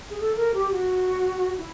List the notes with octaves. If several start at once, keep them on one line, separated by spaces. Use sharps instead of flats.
G#4
A4
A#4
G4
F#4
E4